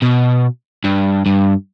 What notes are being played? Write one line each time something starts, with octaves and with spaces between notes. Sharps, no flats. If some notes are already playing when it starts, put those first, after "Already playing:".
B2
G2
G2